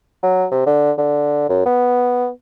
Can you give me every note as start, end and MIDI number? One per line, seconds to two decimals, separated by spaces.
0.23 0.46 54
0.52 0.65 48
0.67 0.92 50
0.98 1.49 50
1.49 1.61 42
1.66 2.29 59